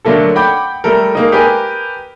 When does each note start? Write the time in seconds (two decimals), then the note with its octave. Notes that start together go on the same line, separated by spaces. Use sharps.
0.05 D3 F#3 A3 A#3 A4
0.36 F#5 G5 B5 D6 G6
0.84 G3 A3 A4 A#4
1.15 G#3 A#3 D#4
1.32 G4 A#4 B4 G#5